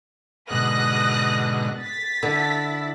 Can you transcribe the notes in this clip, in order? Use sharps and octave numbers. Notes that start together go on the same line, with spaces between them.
G#2 B2 D3 D#6 F#6 A#6
A6 B6
D3 E4